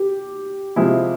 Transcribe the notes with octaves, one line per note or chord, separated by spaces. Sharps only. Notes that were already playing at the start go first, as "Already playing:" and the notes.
Already playing: G4
C3 F3 G#3 C4 E4